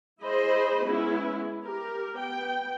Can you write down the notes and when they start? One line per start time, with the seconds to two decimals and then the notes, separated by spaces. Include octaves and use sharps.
0.23 E4 G#4 C5 D#5 B5
0.84 G#3 B3 C#4 E4
1.65 G4 A#4
2.16 B3 G5